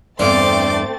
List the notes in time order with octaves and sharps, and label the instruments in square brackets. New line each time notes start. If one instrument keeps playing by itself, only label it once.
[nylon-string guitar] E2 G2 [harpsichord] D3 [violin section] A3 C4 A6 [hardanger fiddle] C6 D6